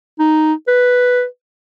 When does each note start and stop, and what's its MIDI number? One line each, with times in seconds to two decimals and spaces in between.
0.19 0.54 63
0.67 1.25 71